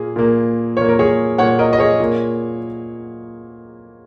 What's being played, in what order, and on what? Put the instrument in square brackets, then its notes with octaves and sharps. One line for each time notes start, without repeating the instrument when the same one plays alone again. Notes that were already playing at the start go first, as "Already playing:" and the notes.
Already playing: [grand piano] A#2 A#3 G#4
A#2 A#3
A#2 A#3 C#5
A#4
G#4 C#5
A#2 A#3 C#5 F#5
A#4 D#5
D#5
G#4 C#5
A#2 A#3